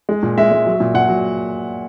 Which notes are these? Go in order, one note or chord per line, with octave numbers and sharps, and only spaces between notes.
G#3
A#2
G#3 E5
G#3
F#3
A#2
A#2 F#5
F#3